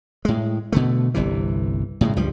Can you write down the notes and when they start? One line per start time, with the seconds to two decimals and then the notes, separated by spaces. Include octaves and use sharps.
0.25 A2 G#3
0.72 B2 D3 A3
1.14 G1 C2 C3 E3
2.01 A2 C#3 F#3 G#3
2.16 C#2 G2 F3 G3